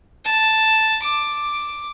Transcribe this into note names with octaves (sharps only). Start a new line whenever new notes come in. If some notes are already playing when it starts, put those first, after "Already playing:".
A5
D6